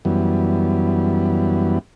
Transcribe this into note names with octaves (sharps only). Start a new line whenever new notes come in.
F#2 E3 G3 B3